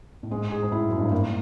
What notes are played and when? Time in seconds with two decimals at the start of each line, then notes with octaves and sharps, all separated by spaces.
0.23 A2
0.31 G#2 G#3
0.51 G#4
0.62 G#2
0.72 A2 E4
0.89 F#2 G#3
0.98 G2
1.04 G#2
1.11 A2 A#3